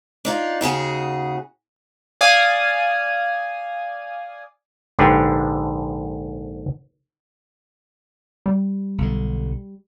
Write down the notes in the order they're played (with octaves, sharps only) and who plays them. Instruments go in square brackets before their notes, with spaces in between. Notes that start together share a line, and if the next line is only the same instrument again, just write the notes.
[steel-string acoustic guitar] D4 D#4 F4
D#2 C#3 F#4 G#4
[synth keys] D5 F5 G#5 D#6
[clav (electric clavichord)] A#1 G#2 D3 D4 G4 B4
[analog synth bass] G3
[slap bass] B1 D3